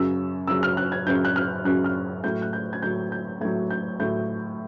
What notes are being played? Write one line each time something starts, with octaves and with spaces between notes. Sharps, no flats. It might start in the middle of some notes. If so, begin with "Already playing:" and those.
Already playing: F#2 C#3 F#3 E6
F#2 C#3 F#3 E6
F6
F#6
G#6
F#2 C#3 F#3 G6
F#6
F6
F#2 C#3 F#3 F#6
F6
A2 F#3 G6
F#6
G6
G#6
A2 F#3 G6
G6
A2 F#3 G#6
G6
A2 F#3 G6